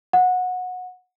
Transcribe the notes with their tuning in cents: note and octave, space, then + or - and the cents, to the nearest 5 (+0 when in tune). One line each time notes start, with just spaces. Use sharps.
F#5 -20